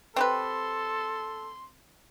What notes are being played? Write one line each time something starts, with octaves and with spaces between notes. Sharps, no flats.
C4 G4 A4 B4 C6